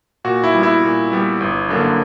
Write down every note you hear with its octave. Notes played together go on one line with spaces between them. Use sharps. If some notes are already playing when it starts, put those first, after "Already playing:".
A#2 F#4
E4
G3 B3
E4
A#2
G3 B3
G1
F#2 D3 A#3